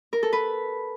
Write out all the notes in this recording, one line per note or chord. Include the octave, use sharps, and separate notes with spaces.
A#4
A4
B4